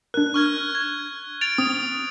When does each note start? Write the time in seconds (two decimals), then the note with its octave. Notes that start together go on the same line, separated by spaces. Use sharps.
0.14 D4 A#4 F#6
0.34 C#6 F6 G#6
0.75 G#6
1.41 A6 D7 F7
1.58 C4 D#6